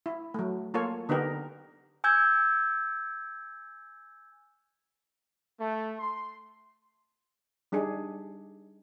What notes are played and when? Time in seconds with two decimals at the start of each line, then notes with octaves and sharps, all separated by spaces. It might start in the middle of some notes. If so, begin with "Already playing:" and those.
0.06 E4
0.34 F#3 A3
0.74 A#3 F4 A4 C#5
1.09 D3 B3 D#4 G4 A#4
2.04 G#5 E6 G6 G#6
5.59 A3
6.00 C6
7.72 G3 D4 D#4 G#4